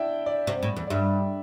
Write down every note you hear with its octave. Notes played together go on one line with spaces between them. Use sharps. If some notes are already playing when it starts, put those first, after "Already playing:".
Already playing: D4 E4 E5 G5
D5
C3
A2
E2
D5
G2 E5